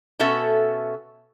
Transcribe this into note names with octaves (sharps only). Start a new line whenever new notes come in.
B2 C#4 F#4 A4 E5